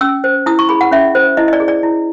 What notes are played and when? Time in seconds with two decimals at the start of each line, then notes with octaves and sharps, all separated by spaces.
0.01 C#4 E6
0.24 C5
0.46 E4 D#6
0.59 C#6
0.69 G#4 B5
0.81 F#5
0.91 C#4 E5
1.15 C5
1.37 E4 D#5
1.48 D#5
1.53 D5
1.60 G#4
1.68 D5
1.83 E4